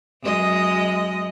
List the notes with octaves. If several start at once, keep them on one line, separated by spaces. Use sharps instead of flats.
F#2 G#3 D#5